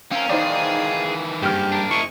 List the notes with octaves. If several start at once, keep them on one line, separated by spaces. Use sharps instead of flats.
C4 C#4 A#4 F5
D#3 E3 D#4 G#4 C5 D5
F#1 G2 G4 F6
D4 A#4
E4 D#5 C#6